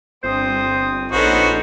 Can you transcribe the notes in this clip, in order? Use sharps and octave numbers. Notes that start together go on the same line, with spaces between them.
G1 C4 C5 D#6
A#1 B3 C#4 D#4 F#4 A4 C5